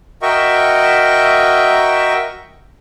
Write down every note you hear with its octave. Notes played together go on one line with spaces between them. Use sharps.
F#4 A#4 D#5 E5 G5 C#6